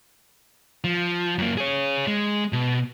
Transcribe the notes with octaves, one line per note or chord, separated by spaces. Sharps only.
F3
F#2 A#3
G#4 C#5
G#3
B2